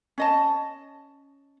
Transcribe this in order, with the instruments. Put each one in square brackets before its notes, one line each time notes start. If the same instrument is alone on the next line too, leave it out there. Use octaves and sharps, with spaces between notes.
[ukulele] C#4 D#5 A5